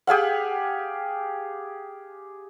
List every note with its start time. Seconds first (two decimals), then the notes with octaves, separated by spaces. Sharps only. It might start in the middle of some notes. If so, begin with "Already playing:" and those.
0.07 G4 G#4 F5 F#5